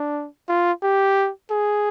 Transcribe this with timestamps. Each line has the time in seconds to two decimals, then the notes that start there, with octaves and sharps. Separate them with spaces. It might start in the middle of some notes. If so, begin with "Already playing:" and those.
Already playing: D4
0.49 F4
0.83 G4
1.50 G#4